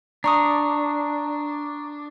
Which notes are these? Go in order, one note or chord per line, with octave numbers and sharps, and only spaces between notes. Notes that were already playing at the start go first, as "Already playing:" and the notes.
D4 A#5 C#6 D#6